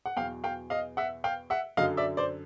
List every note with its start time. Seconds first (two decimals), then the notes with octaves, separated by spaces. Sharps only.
0.06 F#5
0.17 E2 B2 F#3 F5 G5
0.44 F5 G5
0.70 D#5 F5
0.97 E5 F#5
1.24 F5 G5
1.50 E5 F#5
1.77 F#2 D3 F#3 D#5 F5
1.97 D5 E5
2.17 C5 D5